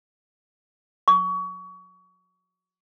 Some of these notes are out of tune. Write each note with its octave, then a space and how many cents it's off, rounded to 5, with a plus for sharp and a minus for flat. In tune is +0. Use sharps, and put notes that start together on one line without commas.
C#6 +30